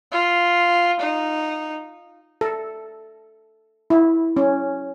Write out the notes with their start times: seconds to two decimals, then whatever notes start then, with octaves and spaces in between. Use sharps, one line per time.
0.12 F4
1.00 D#4
2.41 A4
3.90 E4
4.37 C#4